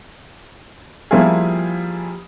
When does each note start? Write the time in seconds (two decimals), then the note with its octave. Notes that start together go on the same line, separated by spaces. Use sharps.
1.11 F3 G3 A#3 E4 F4 G#4